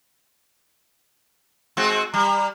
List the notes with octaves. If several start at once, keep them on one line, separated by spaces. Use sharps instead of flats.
G#3 C4 F#4
G3 A#5